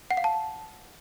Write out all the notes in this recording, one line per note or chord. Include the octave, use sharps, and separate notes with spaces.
F#5
F5
A5